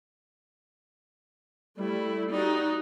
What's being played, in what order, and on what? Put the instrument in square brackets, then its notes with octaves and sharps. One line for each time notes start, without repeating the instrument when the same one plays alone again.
[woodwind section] G3 [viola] A3 E4
[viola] D#4 F#4 [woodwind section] G4 D5